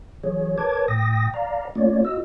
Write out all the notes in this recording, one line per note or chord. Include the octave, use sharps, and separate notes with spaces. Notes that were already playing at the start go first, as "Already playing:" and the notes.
E3 F#3 G#4 C#5
A#4 B4 C#5 A5 D6 G#6
A2 G5 D#6 A#6
D5 F5 A#5
A3 A#3 C#4 F4 C#5 D5
F4 F#4 D#5 E6